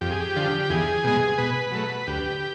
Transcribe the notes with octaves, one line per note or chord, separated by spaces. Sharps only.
F2 G4
G#4
G4
D3 F3
E2 G#4
B2 G#3
B2 B4
F#3 A3
D2 G4